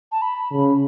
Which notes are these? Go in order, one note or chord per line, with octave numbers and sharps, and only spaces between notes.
A5
B5
C#3